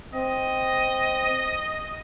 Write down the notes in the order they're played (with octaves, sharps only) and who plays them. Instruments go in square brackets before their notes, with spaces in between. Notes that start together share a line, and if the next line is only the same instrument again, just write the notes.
[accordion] C4 [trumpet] D#5